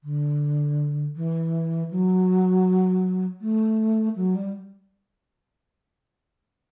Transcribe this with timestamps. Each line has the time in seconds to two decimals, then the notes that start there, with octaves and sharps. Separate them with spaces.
0.04 D3
1.16 E3
1.91 F#3
3.41 A3
4.16 F#3
4.35 G3